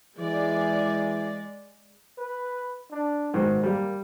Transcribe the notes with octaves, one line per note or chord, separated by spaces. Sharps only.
E3 G#3 G#4 D5
B4
D4
G#2 B2 D#3
G3 A#3